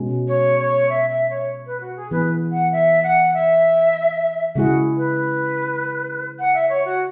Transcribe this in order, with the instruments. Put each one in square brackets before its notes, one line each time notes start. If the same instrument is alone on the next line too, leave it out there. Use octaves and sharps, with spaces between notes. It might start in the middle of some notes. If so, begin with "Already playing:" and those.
Already playing: [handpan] B2 G#3 C#4
[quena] C#5
C#5
E5
E5
C#5
B4
F#4
G#4
[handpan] E3 B3 G#4 [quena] B4
[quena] F#5
E5
F#5
E5
[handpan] C#3 G#3 E4 G#4 [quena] F#4
[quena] B4
F#5
E5
C#5
F#4